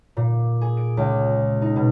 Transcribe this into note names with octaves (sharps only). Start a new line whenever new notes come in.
A#2
G#4
D7
C#2
D#4
B2